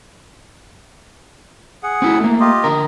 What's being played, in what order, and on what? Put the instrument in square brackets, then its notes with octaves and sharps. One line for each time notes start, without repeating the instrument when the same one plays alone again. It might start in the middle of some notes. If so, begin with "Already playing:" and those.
[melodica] G#4 F#5
[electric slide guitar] C4 E4 F#4
A3 A#3
[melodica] F4 G4 D#5
[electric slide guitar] D3 A#4